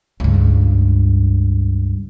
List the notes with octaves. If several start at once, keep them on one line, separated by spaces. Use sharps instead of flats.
C#2 G2